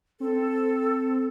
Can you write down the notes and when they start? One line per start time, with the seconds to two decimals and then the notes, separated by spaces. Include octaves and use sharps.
0.20 C4 A4